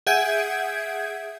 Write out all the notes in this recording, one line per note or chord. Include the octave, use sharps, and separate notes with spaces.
G#4 E5 F#5 G6 G#6 D7